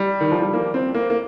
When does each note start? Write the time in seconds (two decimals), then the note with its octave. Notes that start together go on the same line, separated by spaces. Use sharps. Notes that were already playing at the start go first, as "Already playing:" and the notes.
Already playing: G3
0.20 D#3
0.32 F3
0.42 G3
0.53 A#3
0.74 C4
0.95 A#3
1.10 A#3